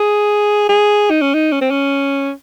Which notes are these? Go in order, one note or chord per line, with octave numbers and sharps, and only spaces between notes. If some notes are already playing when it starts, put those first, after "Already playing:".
Already playing: G#4
G#4
D#4
C#4
D#4
C#4
C4
C#4